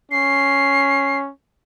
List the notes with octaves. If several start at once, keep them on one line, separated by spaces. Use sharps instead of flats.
C#4 C7